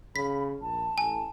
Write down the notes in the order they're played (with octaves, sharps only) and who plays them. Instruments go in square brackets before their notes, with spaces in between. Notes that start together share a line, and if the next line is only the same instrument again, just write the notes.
[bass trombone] C#3 [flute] B5 [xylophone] B6
[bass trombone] A#1 [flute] A5
[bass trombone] A1 [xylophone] G#5